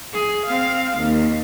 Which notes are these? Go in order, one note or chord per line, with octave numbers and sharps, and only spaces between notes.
G#4
C4 F5
D#2